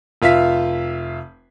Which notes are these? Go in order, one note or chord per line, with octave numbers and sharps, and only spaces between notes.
F1 F4 E5 F5 B6